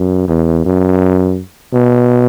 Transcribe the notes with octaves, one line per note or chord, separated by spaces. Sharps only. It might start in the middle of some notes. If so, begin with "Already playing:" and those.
Already playing: F#2
E2
F#2
B2